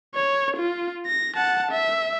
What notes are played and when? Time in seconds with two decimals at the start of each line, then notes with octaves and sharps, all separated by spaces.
0.15 C#5
0.57 F4
1.06 A#6
1.37 F#5 A5
1.72 E5